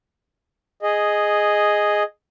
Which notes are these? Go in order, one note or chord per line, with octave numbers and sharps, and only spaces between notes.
G#4 D#5